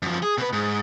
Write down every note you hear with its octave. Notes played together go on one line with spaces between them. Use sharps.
F#2 F3
G#4
B2 B4
G#2